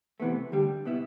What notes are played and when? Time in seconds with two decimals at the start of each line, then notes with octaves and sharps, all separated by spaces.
0.20 C3 E3 A3 B3
0.52 D2 D3 G3 G4
0.85 B2 B3 E4